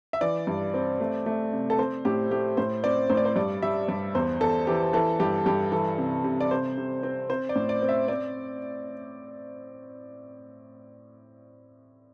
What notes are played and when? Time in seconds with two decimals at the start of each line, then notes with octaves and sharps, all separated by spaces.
0.13 E5
0.21 E3 D5
0.47 G2
0.74 C4
1.00 A3
1.26 A3
1.53 C3
1.70 A4
1.79 C4 C5
2.05 A2 G4
2.31 A3 G4
2.57 A2 C5
2.84 C4 D5
3.10 A2 C5
3.17 D5
3.25 C5
3.36 G2 D5
3.62 G3 E5
3.88 G2 D5
4.15 E2 C5
4.41 E2 A4
4.67 E3 G4
4.93 E3 A4
5.20 G2 G4
5.46 G2 G4
5.72 E3 A4
5.98 C3
6.24 C3
6.41 D5
6.51 C3 C5
6.77 C3
7.03 C4
7.29 C4 C5
7.49 D5
7.56 A2
7.69 D5
7.82 C4
7.89 E5
8.08 C4 D5